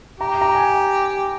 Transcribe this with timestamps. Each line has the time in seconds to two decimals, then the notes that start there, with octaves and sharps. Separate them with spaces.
0.20 G4 A#5
0.41 A#5
0.55 G#5